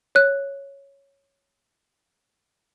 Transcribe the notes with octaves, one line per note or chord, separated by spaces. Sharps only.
C#5 F#6